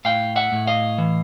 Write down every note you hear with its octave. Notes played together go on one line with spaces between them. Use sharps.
A2 F5 G5
E5 F#5
A2
D#5 F5
E3